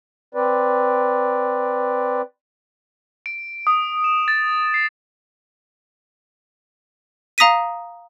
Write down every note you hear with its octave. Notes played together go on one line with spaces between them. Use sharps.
C4 B4 D5
D7
D#6
E7
A6
C7
F5 A#5 D#6 A#6 B6 D#7